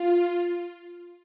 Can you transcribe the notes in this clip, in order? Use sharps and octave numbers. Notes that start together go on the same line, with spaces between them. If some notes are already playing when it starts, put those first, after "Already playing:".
Already playing: F4